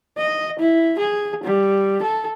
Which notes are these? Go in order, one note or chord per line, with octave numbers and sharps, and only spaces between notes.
D#5
E4
G#4
G3
A4